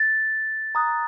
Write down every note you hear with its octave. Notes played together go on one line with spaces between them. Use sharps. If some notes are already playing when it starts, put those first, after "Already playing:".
Already playing: A6
A#5 D#6 F#6